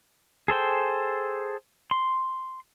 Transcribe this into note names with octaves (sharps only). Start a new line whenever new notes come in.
G#4 A4 C5 G5
C6